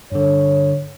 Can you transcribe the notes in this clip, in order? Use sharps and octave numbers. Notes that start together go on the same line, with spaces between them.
G2 D3 C#5